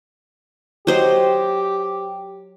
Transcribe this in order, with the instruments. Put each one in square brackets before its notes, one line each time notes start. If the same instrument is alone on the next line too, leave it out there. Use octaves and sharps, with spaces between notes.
[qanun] F#3 C5 D#5 [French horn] G4